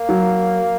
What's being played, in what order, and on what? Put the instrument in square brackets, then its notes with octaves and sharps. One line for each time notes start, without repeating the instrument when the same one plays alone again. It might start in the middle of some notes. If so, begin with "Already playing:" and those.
Already playing: [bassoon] A#3
[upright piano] F#3